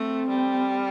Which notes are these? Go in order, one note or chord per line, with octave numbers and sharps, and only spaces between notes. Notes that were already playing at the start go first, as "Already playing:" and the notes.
Already playing: A3 C4
G3